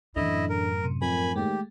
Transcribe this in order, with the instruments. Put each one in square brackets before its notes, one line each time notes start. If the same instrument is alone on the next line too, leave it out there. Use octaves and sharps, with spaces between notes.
[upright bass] F#2 A2 [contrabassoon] D3 [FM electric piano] E3 [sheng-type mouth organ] E4 D#5
[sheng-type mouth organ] A#4
[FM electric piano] C3
[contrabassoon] F2 [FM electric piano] A#4 [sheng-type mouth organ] G#5 B5
[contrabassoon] D#2 [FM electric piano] G#3 A3 [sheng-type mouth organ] G4